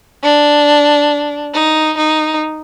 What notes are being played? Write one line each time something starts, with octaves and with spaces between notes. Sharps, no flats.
D4
D#4
D#4